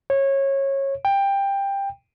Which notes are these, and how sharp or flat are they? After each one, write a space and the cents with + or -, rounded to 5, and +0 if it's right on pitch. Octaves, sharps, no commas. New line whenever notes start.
C#5 -20
G5 +15